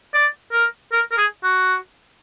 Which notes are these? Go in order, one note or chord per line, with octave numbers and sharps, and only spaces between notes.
D5
A#4
A#4
A#4
G#4
F#4